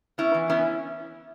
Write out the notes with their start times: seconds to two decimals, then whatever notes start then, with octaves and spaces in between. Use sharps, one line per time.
0.18 B3 C#4 E4
0.34 E3
0.50 B3 C#4 E4